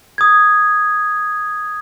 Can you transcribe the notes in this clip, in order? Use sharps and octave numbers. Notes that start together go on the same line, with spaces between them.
D#6 G#6